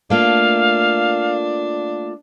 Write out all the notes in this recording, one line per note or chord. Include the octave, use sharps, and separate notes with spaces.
A3 A#3 D4 F4 F5